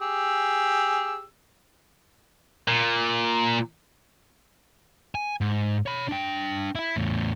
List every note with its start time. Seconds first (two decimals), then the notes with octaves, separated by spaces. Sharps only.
0.02 G4 G#4 E6
2.68 A#2
5.15 G#5
5.41 G#2
5.86 C#5 B5
6.08 D4 G5
6.75 E4 E5
6.96 E2 A2